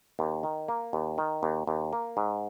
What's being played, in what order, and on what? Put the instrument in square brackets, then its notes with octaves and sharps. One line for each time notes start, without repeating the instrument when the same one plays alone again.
[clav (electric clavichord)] D#2
D#3
A#3
D#2
D#3
D#2
D#2
A#3
G#2